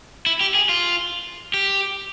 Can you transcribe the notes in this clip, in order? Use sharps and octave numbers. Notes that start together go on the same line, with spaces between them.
E4
G4
G#4
F4
G4